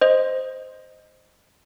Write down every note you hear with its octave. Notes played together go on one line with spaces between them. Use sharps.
C5 D#5